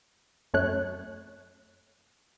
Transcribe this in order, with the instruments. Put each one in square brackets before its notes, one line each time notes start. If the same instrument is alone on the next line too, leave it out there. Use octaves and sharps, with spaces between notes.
[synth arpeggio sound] F#2 A3 C#5 F#6